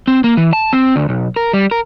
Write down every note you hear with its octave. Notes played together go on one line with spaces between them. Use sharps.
C4
A#3
E3
A5
C4
D2
B1
A#4
G3
A#4